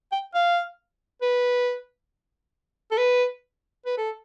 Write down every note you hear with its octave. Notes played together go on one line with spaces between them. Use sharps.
G5
F5
B4
A4
B4
B4
A4